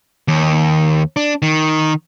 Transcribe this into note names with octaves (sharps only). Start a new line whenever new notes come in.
D#2
D4
D#3